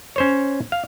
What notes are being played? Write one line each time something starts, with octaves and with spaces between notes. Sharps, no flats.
C#4 C5 C#5
F5